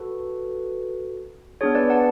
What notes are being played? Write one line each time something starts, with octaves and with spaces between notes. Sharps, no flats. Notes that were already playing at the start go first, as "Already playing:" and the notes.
Already playing: F#4 A4 B4
B3 D4 G#4 C#5
B4 D5
F#5 A5